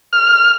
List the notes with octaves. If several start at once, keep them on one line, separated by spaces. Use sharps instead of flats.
F6